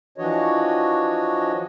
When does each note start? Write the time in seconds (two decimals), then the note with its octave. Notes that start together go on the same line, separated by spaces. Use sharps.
0.18 E3 F3 D4 F#4 C#5 D#5